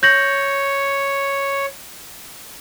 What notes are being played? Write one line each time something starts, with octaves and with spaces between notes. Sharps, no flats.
C#5 G6 A#6 F#7